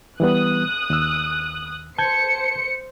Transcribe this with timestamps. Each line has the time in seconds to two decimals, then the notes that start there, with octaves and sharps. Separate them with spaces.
0.20 E3 G3 B3 D#6 F#6
0.90 D#2 E6
1.98 C5 A5 G6 G#6 C#7